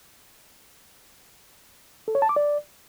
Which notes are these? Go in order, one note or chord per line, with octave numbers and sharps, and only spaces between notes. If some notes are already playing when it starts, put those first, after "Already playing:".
A4
C#5
A5
D6
D5